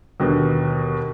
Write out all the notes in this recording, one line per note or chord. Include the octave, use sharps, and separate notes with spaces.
D#2 B2 D3